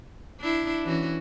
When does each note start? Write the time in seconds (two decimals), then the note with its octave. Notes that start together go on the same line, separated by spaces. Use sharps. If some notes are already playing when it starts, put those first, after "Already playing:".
0.40 D4 E4
0.85 E3 C#4 F#4